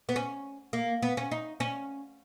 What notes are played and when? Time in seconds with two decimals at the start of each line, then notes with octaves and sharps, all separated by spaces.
0.09 B3
0.16 C#4
0.73 A#3
1.02 B3
1.17 C#4
1.31 D#4
1.60 C#4